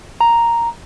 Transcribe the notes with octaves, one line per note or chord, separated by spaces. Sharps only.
A#5